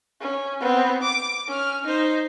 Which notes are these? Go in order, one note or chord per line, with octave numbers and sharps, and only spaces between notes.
C#4
B3 C4
D6
C#4 F6
D#4 C5